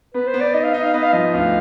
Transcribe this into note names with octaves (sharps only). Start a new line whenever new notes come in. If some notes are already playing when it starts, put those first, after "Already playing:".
B3 B4
C5
B3
D5
D#4 D#5
F5
D#4 D#5
F5
B3 D#5
F5
F3 D#5
D2 F5